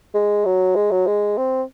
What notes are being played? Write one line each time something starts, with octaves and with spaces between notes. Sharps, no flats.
G#3
F#3
G#3
F#3
G#3
C4